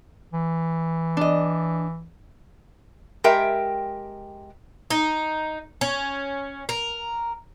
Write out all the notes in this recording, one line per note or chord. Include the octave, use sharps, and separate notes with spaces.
E3
D4 D#5
G#3 G4 A#4 E5 G5
D#4
C#4
A#4